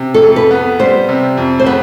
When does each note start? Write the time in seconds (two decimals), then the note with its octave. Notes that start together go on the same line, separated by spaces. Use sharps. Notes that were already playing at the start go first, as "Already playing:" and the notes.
Already playing: C3
0.14 A4
0.22 F2
0.36 B4
0.51 B3
0.80 G3 C5
1.09 C3
1.37 F2
1.60 C5
1.66 B3 B4